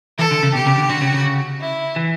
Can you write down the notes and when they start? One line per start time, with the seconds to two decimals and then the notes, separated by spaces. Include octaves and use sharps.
0.19 E3 A4
0.31 D3
0.43 C#3
0.54 B2 G4
0.66 C#3
0.78 D3
0.89 D3 F#4
1.02 C#3
1.14 C#3
1.61 E4
1.96 E3